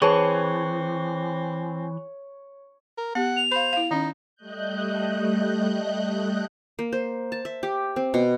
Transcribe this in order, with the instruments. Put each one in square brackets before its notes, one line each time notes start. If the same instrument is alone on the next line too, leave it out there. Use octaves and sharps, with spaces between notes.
[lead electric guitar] E3 [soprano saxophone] C4 [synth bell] G#4 B4 A5 [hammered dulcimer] C#5
[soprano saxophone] A#4
[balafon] B3 G4 [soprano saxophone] F#5
[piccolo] F7
[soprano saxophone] C5 [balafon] F5 B5
[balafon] E4 F5
[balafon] D#3 C#4 [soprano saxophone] D#4
[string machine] G3 A3 D#5 F#6 G6
[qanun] A#3
C5
A5
E5
G4
C4
B2